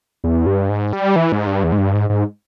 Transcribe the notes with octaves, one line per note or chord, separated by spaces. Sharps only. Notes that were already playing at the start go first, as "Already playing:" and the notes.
E2
G2
G#2
G3
E3
G#2
G2
E2
G#2
G2
G#2
G#2